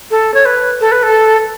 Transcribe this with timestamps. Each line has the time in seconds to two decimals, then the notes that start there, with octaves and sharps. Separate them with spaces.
0.11 A4
0.34 C#5
0.45 B4
0.81 A4
0.92 B4
1.03 A4